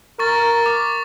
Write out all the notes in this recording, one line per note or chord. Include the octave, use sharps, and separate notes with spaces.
A#4 C#6 A6
D6